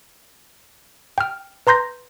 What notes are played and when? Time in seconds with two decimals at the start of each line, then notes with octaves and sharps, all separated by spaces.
1.18 G5 F6
1.67 B4 A#5 C6 G6 A#6